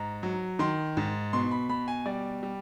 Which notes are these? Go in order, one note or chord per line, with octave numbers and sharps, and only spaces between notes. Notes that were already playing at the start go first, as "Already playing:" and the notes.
Already playing: G#2 A#5
F#3
D#3 C6
G#2
B2 C6
B5
B2 B5
G#5
G3 D5
G3